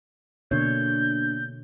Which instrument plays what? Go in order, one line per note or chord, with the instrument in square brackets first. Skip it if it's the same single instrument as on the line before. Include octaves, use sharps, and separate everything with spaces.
[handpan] B2 D3 C#5 [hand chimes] A#3 D4 [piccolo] G6